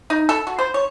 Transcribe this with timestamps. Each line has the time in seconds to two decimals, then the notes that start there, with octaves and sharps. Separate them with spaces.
0.10 D#4
0.29 A4
0.47 F#4
0.59 C5
0.74 C#5